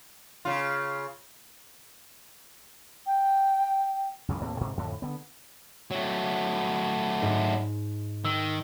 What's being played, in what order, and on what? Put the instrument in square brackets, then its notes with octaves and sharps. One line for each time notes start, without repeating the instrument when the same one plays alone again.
[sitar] C#3 F4
[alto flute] G5
[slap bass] C#2 F#2 C#3 E3
D#2 A2 A#3 C4
G#2 C3
F2 A2 D3
D3 B3
[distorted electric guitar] F#3 A3
[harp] G#2
[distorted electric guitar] D#3 [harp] E6